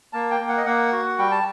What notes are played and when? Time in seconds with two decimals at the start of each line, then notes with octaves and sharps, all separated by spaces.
0.13 A#3 A5
0.31 G5
0.40 A#3
0.48 F#5
0.57 D#5
0.66 A#3 F#5
0.92 F#4
1.18 G3 G5
1.31 A5